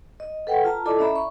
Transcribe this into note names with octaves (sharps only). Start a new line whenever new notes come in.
D#5
A4 B4 F#5 G5
F4 A5 A#5
E4 A4 D5 D#5 A5 D6
C#4 D5 E5 A#5 B5
C#6